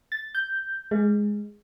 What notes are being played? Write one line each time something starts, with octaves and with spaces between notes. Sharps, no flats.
A6
G6
G#3